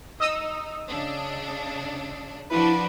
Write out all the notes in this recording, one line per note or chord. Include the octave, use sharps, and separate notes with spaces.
D#4 D#5 D#6 E6
C#3 D4
F3 D4 E4 F#4 B4